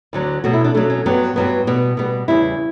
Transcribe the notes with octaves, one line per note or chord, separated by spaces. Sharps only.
D2 D3 F#3
B2 F#3 A3 F#4
E4
D4
B2 F#3 A3 D4
C#4
G2 F#3 B3
G2 F#3 B3
B2 G3 B3
B2 G3 B3
E2 C#3 G3 E4